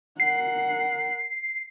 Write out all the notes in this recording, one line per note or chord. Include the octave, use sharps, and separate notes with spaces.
A#4 F#5 C7